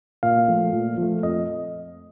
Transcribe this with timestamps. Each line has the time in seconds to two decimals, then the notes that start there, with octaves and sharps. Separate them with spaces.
0.23 A#2 F5
0.48 F3 A3
0.73 A#2
0.98 F3 A3
1.23 F2 D#5